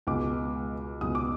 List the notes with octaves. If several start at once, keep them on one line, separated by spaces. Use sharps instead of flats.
C#2 B2 G#3 D6
C#2 B2 G#3 D#6
D6